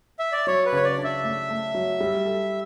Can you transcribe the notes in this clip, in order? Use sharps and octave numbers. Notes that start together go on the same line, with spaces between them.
E5
D5
F#3 C#5
B4
C#3 C#5
D5
D4
E5
A3
A3
F#3
G3
A4